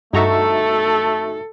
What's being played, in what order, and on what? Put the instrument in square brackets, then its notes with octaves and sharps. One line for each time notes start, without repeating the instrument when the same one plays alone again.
[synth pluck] G2 A#5 C#6 [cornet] A3 [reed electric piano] D#4 F#4 E5 [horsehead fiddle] A4